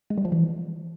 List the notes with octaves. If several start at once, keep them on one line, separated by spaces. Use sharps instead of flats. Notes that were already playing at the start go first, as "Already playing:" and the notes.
G#3
G3
F3
E3